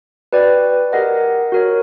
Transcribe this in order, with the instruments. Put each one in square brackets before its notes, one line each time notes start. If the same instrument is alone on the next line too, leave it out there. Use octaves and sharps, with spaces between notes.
[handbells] F#4 B4 D5 G5
G4 A#4 D#5 F#5
F#4 A#4 C#5